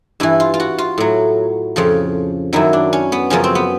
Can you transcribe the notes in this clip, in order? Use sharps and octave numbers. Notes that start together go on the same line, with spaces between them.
G2 E3 E4
F4
F4
F#4
F4
A2 F#3
F2 C#3 F3
F#2 D#3 F#3 E4
D4
C#4
B3
F#2 C#3 F3 C#4
C4
B3